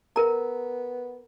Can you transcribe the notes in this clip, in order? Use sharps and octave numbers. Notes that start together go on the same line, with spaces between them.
B3 A#4 A#5